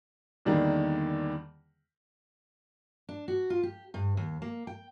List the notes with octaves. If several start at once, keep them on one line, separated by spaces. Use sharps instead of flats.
E2 D3 D#3 G3 A#3
D4
F#4
F4
G4
G2
D#2
A#3
G5